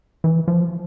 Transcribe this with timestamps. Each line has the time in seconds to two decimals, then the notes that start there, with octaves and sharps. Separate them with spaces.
0.24 E3
0.48 F3